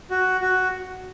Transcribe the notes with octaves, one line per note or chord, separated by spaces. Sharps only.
F#4
F#4